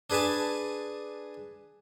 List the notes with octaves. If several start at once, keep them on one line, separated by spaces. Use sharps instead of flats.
D4 G#4 B4 G#5 A5